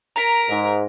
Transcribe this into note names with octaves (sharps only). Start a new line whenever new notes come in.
A#4 A#5 B6
G#2